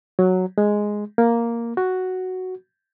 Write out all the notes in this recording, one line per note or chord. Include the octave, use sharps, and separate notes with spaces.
F#3
G#3
A#3
F#4